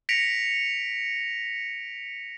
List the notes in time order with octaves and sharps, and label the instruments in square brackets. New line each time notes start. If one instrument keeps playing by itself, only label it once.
[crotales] A#6 B6 C#7 D7 F7